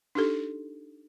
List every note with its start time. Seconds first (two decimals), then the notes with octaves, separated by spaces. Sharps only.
0.15 D4 D#4 G4 A4